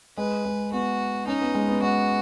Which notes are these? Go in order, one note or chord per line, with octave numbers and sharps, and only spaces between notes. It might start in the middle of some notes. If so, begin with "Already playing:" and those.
G#3 B4
G#3
B3 F#4
C#4 D#4
B3
G#3
B3
G#3 F#4